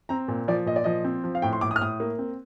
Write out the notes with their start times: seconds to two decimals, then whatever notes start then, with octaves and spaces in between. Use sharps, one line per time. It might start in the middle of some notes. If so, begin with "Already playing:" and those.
0.09 C4 A#5
0.28 A#2
0.48 F3 D5
0.66 A#2 D#5
0.76 D5
0.84 F3 D#5
1.05 C4
1.24 F3
1.35 F5
1.42 A2 G5
1.53 C6
1.61 A2 D6
1.71 D#6
1.76 F6
1.81 A2 D#6
2.00 A#3
2.19 C4